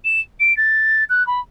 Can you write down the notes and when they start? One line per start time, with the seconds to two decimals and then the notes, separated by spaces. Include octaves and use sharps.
0.04 E7
0.39 D7
0.56 A6
1.09 F#6
1.26 B5